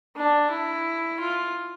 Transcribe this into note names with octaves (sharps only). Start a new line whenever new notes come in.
D4
E4
F4